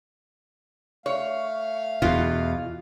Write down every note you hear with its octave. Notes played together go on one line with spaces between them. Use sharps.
A3 C#5 F5
E2 B2 F4